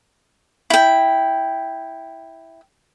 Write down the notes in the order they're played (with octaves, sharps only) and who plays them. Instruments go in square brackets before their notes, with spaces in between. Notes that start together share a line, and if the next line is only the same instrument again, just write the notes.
[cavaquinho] E4 G5